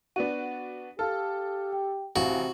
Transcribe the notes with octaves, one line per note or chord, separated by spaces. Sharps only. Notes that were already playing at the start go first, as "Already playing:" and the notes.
B3 D4 F#4 D#7
G4 A4 F5 A5 F6
G5
A1 C3 F#4 F5